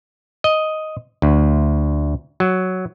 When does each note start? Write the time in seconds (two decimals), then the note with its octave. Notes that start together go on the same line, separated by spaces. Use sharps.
0.44 D#5
1.22 D2
2.40 F#3